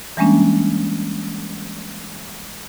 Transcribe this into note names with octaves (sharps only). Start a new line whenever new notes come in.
E3 G3 G#3 A#3 C#4 D4